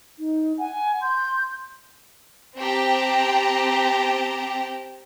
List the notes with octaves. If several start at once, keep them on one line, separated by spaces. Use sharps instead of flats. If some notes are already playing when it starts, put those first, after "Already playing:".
D#4
F#5 G#5
C6 G6
C4 G4 G5 A5 A#5